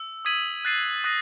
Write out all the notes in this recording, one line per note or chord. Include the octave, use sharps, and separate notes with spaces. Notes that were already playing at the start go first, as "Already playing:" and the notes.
Already playing: E6
D#6 G#6 B6 D#7 F#7
F#6 A6 C7 D#7
D#6 F#6 A#6 D#7